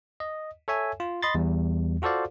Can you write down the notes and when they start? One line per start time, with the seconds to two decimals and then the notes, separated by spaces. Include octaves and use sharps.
0.20 D#5
0.68 A4 C#5 E5 G#5
1.00 F4
1.23 D#5 B5 C6 A6
1.35 E2 G3
2.02 F4 F#4 A4 C5 D5 F5